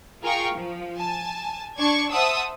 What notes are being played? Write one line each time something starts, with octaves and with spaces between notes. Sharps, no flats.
F4 G#4 A#4 F5 G5 C#6
F3
G#5 A5
D4 D5 C#6 G#6
C5 E5 F#5 A5 D#6 E6